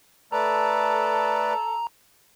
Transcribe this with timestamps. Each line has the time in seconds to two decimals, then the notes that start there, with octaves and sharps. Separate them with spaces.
0.32 A3 A4 B4 D5 A#5